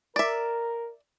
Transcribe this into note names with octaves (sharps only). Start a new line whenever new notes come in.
A#4 D5 E5